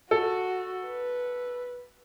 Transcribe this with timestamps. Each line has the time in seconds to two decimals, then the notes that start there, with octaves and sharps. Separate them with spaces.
0.11 F#4 A4
0.87 B4